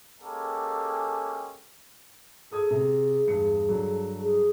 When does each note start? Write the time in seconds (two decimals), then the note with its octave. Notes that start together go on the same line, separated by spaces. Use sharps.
0.20 G#3 A#3 C#4 G4 A4
2.51 G#4 A4 D#6 G#6
2.71 C3
3.27 E2 G2 C#7
3.68 G2 D3 F#3
4.21 G#4